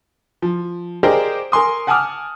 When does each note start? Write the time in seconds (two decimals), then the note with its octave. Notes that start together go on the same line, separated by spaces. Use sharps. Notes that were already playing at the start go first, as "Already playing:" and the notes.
0.42 F3
1.03 G4 G#4 A#4 C5 D5 D#5
1.52 A#4 G#5 C6 D#6
1.87 F#5 G#5 A5 D6 D#6 F6